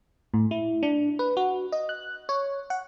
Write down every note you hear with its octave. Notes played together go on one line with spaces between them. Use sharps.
A2
E4
D4
B4
F#4
D#5
F#6
C#5
F#5